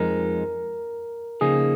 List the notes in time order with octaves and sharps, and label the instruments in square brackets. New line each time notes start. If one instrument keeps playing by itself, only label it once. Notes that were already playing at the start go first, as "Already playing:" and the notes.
Already playing: [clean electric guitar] F2 F3 G#3 D#4 [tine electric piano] A#4
[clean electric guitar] C#3 F3 A#3 D#4 [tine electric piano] G#4